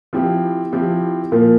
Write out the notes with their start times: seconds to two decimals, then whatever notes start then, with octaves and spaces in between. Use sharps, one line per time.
0.13 F3 C4 E4 G4
0.72 F3 C4 E4 G4
1.32 A#2 F3 A#3